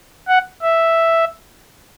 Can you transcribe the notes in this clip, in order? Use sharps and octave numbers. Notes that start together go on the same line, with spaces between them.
F#5
E5